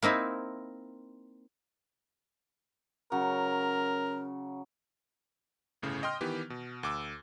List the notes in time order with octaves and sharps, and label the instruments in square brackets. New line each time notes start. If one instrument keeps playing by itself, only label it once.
[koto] A#3 C4 D#4 E4
[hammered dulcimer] C#3 F#3 [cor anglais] A#4
[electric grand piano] G1 A2 C#3
D#5 G5 C6 F6
D#3 E3 B3 G4
B2
D2 D6 E6